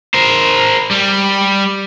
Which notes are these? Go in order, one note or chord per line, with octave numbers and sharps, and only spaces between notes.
A#4 C5
G3